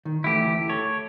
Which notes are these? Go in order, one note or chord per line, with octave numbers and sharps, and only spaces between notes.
D#3
D2 E3 A3 E4 G4
A4 C#5